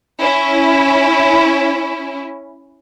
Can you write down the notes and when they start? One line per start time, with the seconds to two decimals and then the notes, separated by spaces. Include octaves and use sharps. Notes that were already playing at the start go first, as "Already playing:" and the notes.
0.21 C#4 E4